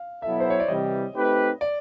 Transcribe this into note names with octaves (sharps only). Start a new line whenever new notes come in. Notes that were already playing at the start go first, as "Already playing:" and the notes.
Already playing: F5
B2 F#3 B3 E4 A4 E5
C5
C#5
D5
C3 E3 G3 D#5
A3 C4 D#4 G4 B4
D5